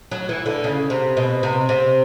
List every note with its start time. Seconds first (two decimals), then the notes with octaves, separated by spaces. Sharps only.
0.11 F#3
0.29 E3
0.46 D3
0.64 C#3
0.90 C3
1.17 B2
1.43 C3
1.69 C3